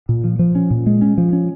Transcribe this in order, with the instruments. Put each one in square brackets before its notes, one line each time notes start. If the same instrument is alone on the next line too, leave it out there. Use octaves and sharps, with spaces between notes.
[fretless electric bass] A#2
F3
F3
C#4
A#2
G#3
C#4
F3
C#4